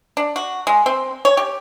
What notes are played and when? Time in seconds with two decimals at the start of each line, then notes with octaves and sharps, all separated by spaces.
0.17 D4
0.36 F#4
0.67 G#3
0.86 C4
1.25 C#5
1.37 G4